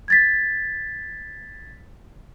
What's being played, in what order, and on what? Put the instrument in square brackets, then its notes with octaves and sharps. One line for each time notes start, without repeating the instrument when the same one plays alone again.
[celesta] G#6 A6 B6